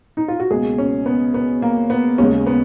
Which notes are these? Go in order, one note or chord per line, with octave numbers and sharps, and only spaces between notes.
D#4
F4
F#4
C#2 B2 A#3 G#4
C#4
B3
B3
A#3
B3
D#2 C#3 G#3 C#4
B3